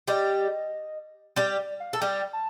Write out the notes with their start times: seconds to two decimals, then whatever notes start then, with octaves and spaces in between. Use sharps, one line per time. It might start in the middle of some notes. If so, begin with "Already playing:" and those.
0.08 G3 G4 D#5
1.36 G3 G4 D5
1.59 D5
1.80 F5
1.93 A4 A5
2.01 G3 G4 G5
2.33 A5